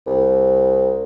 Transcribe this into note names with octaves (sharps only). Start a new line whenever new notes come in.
C2